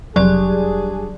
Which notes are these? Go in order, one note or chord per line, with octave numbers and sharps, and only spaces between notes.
F1 F#3 G3 D4 G#4 D5